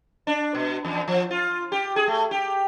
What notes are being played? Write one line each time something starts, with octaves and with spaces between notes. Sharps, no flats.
D4
B2
E2
F3
F4
G4
G#4
A3
G4